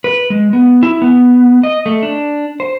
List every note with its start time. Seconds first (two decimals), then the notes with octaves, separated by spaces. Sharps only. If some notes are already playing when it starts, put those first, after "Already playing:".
0.04 B4
0.30 G#3
0.53 B3
0.83 E4
1.02 B3
1.63 D#5
1.86 A3
2.03 D4
2.60 C5